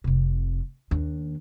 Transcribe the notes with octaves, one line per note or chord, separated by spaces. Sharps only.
F1 C3
D#2 D4